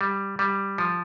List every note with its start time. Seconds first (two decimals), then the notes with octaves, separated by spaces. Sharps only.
0.01 G3
0.39 G3
0.78 F3